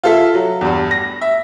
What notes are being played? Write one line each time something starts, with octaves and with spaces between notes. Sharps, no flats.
F4 A4 E5
F#3
E2 G2
A#6
E5